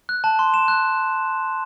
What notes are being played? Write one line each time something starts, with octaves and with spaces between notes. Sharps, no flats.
F#6
A5
C6
E7
F#6